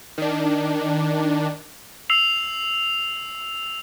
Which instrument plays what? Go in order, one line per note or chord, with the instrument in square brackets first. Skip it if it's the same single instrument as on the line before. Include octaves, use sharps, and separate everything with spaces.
[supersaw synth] D#3 D4
[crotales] E6 C7 F7